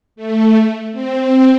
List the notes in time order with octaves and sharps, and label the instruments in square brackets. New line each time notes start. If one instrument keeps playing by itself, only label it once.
[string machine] A3
C4
C4